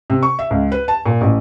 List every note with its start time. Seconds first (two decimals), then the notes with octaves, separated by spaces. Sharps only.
0.10 C3
0.23 C#6
0.39 E5
0.51 C#2
0.72 B4
0.88 A5
1.06 A#2
1.21 A1